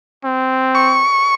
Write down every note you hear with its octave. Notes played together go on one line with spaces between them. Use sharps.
C4
C#6